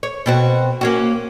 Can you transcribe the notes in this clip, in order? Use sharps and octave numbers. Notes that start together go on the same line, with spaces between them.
C#5
B2 C4 F#4
A#3 C#4 F#4